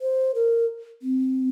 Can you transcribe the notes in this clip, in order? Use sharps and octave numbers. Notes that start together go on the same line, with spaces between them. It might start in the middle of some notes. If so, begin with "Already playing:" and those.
C5
A#4
C4